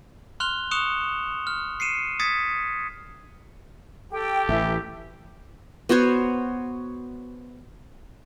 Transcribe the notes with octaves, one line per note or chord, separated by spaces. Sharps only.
C6 F6 F#6 F7 G7
C#6 D#6 F#6 C#7 E7 F7
F6
C7 C#7 D#7 E7
D#6 G#6 A6 B6 C#7
G4 A4 G5
A1 E3 E5
B3 F#4 C5 C#5